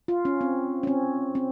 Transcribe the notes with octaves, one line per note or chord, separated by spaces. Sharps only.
F4
C#4
C4
C#4
C4
C4